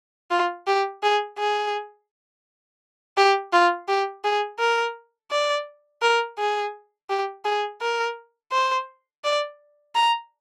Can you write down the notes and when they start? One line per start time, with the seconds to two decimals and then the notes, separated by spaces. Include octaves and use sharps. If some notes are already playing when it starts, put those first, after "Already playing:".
0.31 F4
0.67 G4
1.03 G#4
1.38 G#4
3.17 G4
3.53 F4
3.88 G4
4.24 G#4
4.59 A#4
5.31 D5
6.02 A#4
6.39 G#4
7.10 G4
7.45 G#4
7.82 A#4
8.52 C5
9.24 D5
9.95 A#5